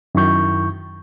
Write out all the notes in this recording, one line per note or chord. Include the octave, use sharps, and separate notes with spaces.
F#2 D#3 E4 C#6 G6